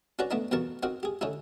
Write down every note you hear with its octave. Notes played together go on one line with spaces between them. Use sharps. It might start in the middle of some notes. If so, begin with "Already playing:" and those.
C#4 D4 F#4 B4 D5 A#5
A3 B3 D4 D#4
A#1 E2 B2 A#4 A5 C#6
C4 D#4 F#4 A#4
G4 G#4
D3 C#4 D#4 E4